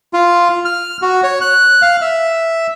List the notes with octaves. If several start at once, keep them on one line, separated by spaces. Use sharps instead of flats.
F4
F6
F#4
C#5
F#6
F5
E5